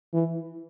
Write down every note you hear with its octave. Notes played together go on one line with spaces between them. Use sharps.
E3